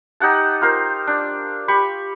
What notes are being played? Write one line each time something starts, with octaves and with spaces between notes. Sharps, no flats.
D#4 G4 F#5 A5
F4 A#4 C5
D4
G4 B5 C#6